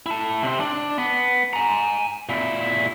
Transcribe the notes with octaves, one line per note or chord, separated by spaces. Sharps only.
E4 A5
C3 C4
D4
B3
G#5 A#5
A#2 E4